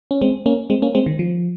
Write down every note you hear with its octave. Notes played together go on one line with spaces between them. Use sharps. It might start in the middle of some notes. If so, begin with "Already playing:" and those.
C#4
G#3 C4
A#3 C#4
G#3 C4
A#3 C#4
G#3 C4
D#3
F3